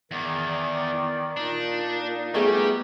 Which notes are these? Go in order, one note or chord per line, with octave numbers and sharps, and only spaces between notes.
E2 D#3 D5
A#2 D4 D#4
G3 A3 B3 G4 G#4